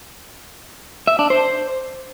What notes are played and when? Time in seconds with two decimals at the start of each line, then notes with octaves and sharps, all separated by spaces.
1.07 E5
1.19 D4
1.30 C5